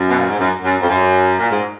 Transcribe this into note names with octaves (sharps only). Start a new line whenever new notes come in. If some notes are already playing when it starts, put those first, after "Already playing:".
Already playing: F#2
B2
A#2
G#2
F#2
F#2
F2
F#2
A#2
G#2